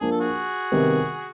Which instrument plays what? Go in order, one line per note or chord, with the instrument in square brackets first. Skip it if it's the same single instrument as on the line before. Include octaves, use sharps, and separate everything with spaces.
[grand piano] F3 A#3 D4 [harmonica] G#4
[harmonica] A4
F#4 G#4
[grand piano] C3 D#3 G3 B3